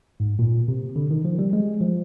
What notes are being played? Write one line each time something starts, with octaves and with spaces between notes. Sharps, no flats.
G#2
A#2
C3
D3
D#3
F3
G3
G#3
F3